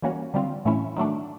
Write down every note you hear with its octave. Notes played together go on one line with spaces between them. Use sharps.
E3 G3 A#3 C#4 F#4
D3 G3 C4 F4
A2 E3 A3 C#4 E4
D#3 F#3 A3 D4